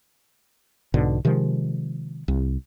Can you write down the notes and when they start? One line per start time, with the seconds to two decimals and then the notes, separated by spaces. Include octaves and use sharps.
0.94 B1 G#2 B2 D3
1.25 C3 D#3 F3 G#3
2.28 C2